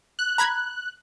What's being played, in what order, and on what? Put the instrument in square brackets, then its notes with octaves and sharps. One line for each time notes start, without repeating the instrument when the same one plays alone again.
[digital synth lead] F#6
[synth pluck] A#5 B5 G#6